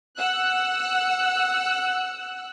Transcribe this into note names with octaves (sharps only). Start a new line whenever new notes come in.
F#5 E6 F#6